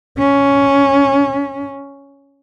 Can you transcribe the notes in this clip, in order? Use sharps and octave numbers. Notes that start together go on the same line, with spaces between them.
C#4